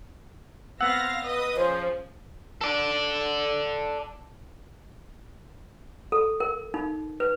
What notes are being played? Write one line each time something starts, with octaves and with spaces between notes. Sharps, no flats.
B3 C4 F5 F#5 E6 A#6
B4 D#5 D#6
F3 C#4 G#4 C5
A4 D5
A4
A#4
D#4
B4